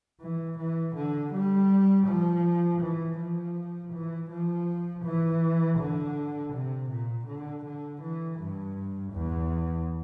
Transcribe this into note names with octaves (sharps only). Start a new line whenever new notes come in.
E3
E3
D3
G3
F3
E3
F3
E3
F3
E3
D3
C3
A#2
D3
D3
E3
G2
E2